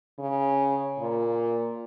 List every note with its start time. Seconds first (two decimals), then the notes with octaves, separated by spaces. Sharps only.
0.19 C#3
1.00 A#2